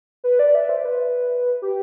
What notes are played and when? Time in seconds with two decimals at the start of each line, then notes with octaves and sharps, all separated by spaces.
0.24 B4
0.39 D5
0.55 E5
0.69 C5
0.85 B4
1.62 G4